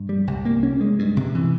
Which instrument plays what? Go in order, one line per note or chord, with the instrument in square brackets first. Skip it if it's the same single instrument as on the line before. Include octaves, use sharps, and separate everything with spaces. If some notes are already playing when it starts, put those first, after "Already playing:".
Already playing: [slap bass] G2
G3
C2
A#3
C#4
G#3
G2
C3
E3